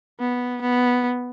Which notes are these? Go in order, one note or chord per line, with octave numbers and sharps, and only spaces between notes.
B3
B3